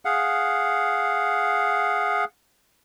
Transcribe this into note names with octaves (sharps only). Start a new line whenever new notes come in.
G#4 F5 F#5